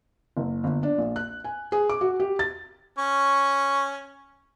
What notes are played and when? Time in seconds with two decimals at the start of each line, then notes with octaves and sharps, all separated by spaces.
0.37 F#1
0.64 G1
0.83 D4
0.98 A#1
1.16 F#6
1.44 G#5
1.72 G#4
1.90 D6
2.01 F#4
2.20 G4
2.39 A6
2.98 C#4 C#6